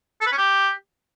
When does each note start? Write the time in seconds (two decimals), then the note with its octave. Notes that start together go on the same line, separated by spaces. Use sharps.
0.21 A4
0.26 B4
0.32 C#4
0.37 G4